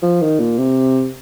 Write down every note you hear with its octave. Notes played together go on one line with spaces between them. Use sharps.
F3
D#3
A#2
C3